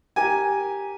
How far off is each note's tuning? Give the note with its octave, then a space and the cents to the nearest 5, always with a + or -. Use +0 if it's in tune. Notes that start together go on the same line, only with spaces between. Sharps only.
G4 +0 A#4 +0 G#5 +0